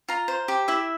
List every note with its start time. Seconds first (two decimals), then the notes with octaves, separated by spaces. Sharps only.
0.08 F4 A#5
0.28 C5
0.48 G4
0.68 E4 E5